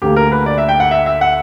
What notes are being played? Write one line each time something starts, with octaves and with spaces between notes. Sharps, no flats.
D2 D3 A#3 G4
A#4
B4
D5
E5
G5
F#5
E5
E5
F#5